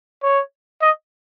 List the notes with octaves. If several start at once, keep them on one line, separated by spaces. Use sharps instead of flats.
C#5
D#5